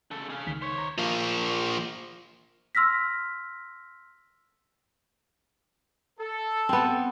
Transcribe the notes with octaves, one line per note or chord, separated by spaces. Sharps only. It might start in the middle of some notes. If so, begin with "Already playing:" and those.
C#3 A4
G#4 F5
C#2 D#3 B6
C5 C#5
A#5
F3 A#3
C6 E6 F6 A#6 B6
A4
B3 C4